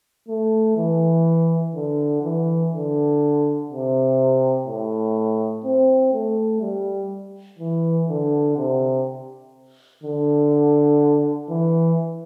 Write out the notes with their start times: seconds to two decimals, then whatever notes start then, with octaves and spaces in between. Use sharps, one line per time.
0.29 A3
0.77 E3
1.75 D3
2.23 E3
2.72 D3
3.70 C3
4.67 A2
5.65 C4
6.13 A3
6.61 G3
7.59 E3
8.09 D3
8.57 C3
10.03 D3
11.49 E3